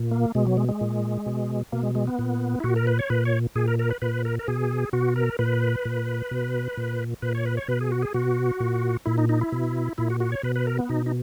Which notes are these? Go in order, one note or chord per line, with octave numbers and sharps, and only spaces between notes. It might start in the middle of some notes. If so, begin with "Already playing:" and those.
Already playing: A#2
A#3
B2 G#3
F#3
G#3
G#3
A#2
B2
B2 A#3
G#3
G#3
B3
A#2
E4
A#2 F#4
A#4
B4
C#5
A#2 B4
C#5
A#2 G#4
A#4
A#4
B4
A#2 B4
A#4
A#4
B2 G#4
B2 F#4
A#4
A#2 B4
A#2
B2
A#2
A#2 B4
C#5
B4
C#5
B2 B4
G#4
F#4
G#4
B2 F#4
A#2
A#2 E4
D#4
D#4
E4
B2
A#2 E4
F#4
F#4
C#5
B2 B4
B4
A#4
B3
B2 D#4
D#4